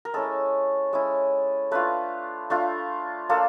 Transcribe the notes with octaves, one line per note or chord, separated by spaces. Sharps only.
A#4
G#3 C#4 E4 A4
G#3 C#4 E4
A3 D4 F4 B4
A3 D4 F4
A#3 D4 F4 A4